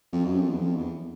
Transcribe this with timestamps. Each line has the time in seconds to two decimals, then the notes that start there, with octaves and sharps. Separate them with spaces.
0.13 F2
0.25 F#2
0.38 F2
0.49 E2
0.60 F2
0.76 E2